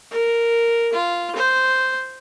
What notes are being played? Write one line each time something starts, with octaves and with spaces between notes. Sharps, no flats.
A#4
F4
C5